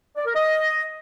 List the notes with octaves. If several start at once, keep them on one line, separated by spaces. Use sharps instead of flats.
D5
A#4
D#5